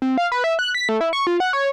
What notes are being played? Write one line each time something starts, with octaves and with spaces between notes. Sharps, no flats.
C4
F5
B4
E5
F#6
B6
A3
E4
C#6
F4
F#5
C#5